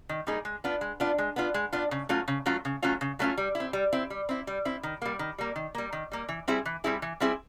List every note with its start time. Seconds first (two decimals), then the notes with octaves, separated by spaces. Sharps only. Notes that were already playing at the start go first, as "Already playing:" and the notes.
0.09 D#3
0.27 G3 A#3 D#4 G#4
0.45 G#3
0.64 B3 D4 F4
0.81 G#3
1.00 B3 D4 F4
1.18 G#3
1.36 B3 D4 F4
1.54 G#3
1.73 B3 D4 F4
1.91 C#3
2.09 F#3 A3 C#4 F4
2.28 C#3
2.46 F#3 A3 C#4 F4
2.65 C#3
2.82 F#3 A3 C#4 F4
3.01 C#3
3.19 F#3 A3 C#4 F4
3.38 G3
3.55 E4
3.60 C4
3.73 G3
3.93 C4 E4
4.10 G3
4.29 C4 E4
4.47 G3
4.65 C4 E4
4.83 D#3
5.02 G3 A#3
5.19 D#3
5.38 G3 A#3
5.56 D#3
5.75 G3 A#3
5.93 D#3
6.12 G3 A#3
6.29 E3
6.48 G3 C4 E4 G#4
6.66 E3
6.84 G3 C4 E4 G#4
7.02 E3
7.20 G3 C4 E4 G#4